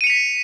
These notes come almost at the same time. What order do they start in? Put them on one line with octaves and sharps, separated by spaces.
D#7 C#7 F7 B6